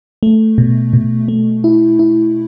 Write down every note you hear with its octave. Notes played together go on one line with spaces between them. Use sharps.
A3
B2
B2
A3
E4
E4